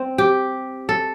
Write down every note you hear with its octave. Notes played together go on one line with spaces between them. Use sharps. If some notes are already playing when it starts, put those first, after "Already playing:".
Already playing: C4
G4
A4